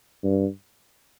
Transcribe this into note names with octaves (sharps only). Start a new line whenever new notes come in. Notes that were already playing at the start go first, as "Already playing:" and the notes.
G2